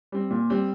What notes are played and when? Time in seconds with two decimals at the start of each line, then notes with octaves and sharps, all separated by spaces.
0.12 G3 C4
0.31 A#2
0.50 G3 C4